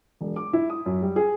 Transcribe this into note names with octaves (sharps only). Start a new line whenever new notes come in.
E1
D6
E4
D#6
F#2
G3
G#4